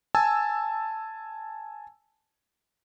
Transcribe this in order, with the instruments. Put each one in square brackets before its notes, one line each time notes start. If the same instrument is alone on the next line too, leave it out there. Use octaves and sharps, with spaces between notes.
[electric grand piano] G#5 A5 E6